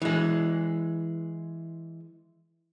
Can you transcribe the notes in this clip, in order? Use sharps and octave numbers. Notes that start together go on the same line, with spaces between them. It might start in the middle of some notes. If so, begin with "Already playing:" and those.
E3 G#3